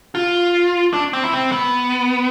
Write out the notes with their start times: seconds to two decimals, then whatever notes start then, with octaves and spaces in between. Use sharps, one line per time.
0.15 F4
0.93 D4
1.13 C4
1.24 E4
1.33 C4
1.52 B3